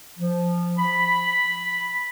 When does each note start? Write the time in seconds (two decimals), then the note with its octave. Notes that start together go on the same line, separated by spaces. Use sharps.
0.18 F3
0.78 B5